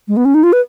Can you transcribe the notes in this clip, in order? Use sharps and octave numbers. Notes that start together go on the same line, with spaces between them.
G#3
B3
C#4
D#4
F4
B4